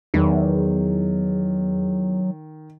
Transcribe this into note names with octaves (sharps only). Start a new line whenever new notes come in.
E2 D#3 F#3